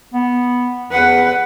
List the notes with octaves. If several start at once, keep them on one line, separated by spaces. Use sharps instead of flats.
B3
E2 B4 F#5